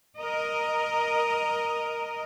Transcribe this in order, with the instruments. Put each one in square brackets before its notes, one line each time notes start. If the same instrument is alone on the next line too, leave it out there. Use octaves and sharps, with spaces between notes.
[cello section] A#4 D#5